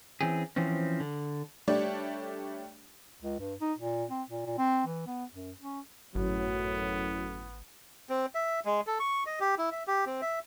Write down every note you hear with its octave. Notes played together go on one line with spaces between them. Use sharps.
E3 C4 C#4 G#4
E3 F3 C4 C#4
D3
G3 A3 D4 G4 C#5 D5
C#2
G2
D#4
A#2
C4
A#2
A#2
C4
E3
B3
F#2
C#4
G#1 F#2 A2 F#3 B3
C4
E5
G#3
A4
C#6
D#5
G4
E4
E5
G4
C4
E5